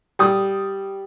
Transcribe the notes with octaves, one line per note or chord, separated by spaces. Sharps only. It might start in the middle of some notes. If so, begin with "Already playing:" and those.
G3 D#6